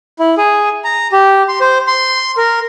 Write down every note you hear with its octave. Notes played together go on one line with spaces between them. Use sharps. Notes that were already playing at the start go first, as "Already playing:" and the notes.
E4
G#4
A#5
G4
C6
C5
C6
A#4